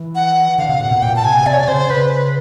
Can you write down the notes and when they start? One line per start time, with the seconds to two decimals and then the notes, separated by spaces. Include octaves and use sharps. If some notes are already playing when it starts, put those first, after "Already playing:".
Already playing: E3
0.15 F#5
0.58 D3 F5
0.69 C3
0.80 A#2 F#5
0.91 B2
1.02 A#2 G5
1.16 A5
1.24 C3 G#5
1.41 B2
1.46 C3 D5
1.54 C#5
1.60 D5
1.68 C#3 C5
1.90 C#3 B4